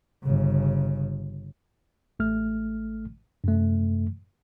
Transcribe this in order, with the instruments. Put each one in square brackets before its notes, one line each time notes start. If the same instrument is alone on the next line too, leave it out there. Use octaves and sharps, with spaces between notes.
[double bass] G1 C#3
[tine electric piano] A1 A3 F6
F#2 C3 A3